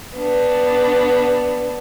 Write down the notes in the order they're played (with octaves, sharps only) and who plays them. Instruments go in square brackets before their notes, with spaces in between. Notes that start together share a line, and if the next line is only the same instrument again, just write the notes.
[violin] B3 D4